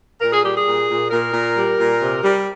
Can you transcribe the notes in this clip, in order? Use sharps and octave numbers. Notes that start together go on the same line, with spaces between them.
A#2 A#4
G#4
G3 G4
G#4
A#2
A#2
A#2 A#4
A#2
G3
A#2
C3
G3